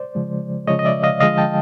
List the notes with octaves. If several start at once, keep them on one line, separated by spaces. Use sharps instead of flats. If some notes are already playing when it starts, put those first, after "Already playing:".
Already playing: C5 D5
C#3 F3 G#3
C#3 F3 G#3 C#5 D#5
D#5
D5 E5
D#5 F5
D3 F3 G#3 D#5 F5
G5 A5